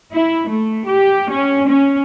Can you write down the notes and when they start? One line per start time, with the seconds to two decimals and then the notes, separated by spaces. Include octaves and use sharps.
0.11 E4
0.48 A3
0.85 G4
1.30 C#4
1.68 C#4